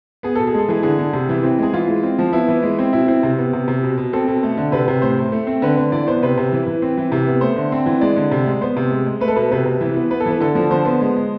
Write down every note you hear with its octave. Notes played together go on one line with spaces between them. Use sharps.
B3 G#4
B2 A4
G#4
G#3 A4
E3 G#4
D3 G#4
D3
C3
E3
C4
G#3 G#4
E3 F4
G#3
C4
F3
B3 E4
E3
G#3
C4
B2 E4
C4
C3
B3
C3
C3
B2
B2
C4 A4
B2
A3
D3
C3 B4
C3
A2 C5
A2
A3
C4
D3 B4
D3
E3 D5
B3 C5
C3 B4
C3
E3
E3
C4
E3
C3
B3
A3 C5
D3
C4
E3
G#3 D5
D3
C3
G#3
B3 C5
C3
G#3
G#3
A3 B4
A4
B2 B4
C3 B4
C3
E3
B3
B3 B4
A4
E3
B4
D3 A4
F3
D3 C5
B3
G#3
G#3